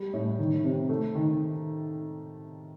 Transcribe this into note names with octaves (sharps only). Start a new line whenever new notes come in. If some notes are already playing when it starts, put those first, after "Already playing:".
Already playing: G3
A2
D#3
C3
A3
D#3